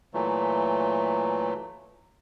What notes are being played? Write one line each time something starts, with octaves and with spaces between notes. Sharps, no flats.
A#2 E3 F#3 A3